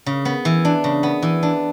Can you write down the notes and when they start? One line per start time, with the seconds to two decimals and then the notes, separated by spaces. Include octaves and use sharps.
0.06 C#3
0.25 B3
0.45 E3
0.65 D4
0.84 C#3
1.03 B3
1.22 E3
1.43 D4